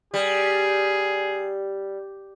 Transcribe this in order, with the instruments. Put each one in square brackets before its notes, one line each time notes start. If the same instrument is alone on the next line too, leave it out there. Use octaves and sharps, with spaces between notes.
[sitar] G3 [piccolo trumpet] G#4